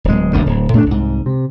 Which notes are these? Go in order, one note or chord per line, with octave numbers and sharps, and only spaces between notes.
D1 G#3
E1 D2 G2 D#3
D1
A2 A3 B3 D4
C2 G#2
C3